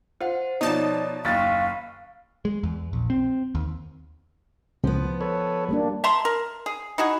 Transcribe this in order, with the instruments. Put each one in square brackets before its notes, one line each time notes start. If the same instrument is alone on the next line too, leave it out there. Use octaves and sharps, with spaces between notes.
[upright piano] F4 [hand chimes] C5 F#5
[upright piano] B2 F3 [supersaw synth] D#4 A5 [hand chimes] C#5 D5
[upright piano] F#1 D#2 A6 [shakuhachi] F5 [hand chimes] C#6 F6 B6
[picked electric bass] G#3
E2
A#1
C4
D#2
[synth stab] C#2 [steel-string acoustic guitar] F3 B3
[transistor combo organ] A4 B4 C#5
[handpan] G3 A#3 D4
[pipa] E5 A5 A#5 C6
A#4
G#4
D#4 E4 F#4 G#4